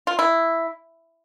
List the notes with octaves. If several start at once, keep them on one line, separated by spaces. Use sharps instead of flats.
F4
E4